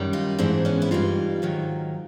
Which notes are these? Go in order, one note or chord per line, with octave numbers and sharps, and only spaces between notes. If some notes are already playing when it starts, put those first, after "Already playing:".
Already playing: F#2 D#3 G3
D#4 F4
G#2 E3 G#3 C4 D4
B3 C#4
E4
G2 E3 G3 D#4 F4
G#2 D#3 F#3